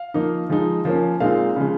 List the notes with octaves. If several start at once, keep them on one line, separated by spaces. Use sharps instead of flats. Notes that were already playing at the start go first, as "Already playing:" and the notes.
Already playing: F5
F3 A#3 D#4
F3 G#3 D#4
F3 A#3 C#4
A#2 G#3 C4 D#4 F5
C#3 F3 G#3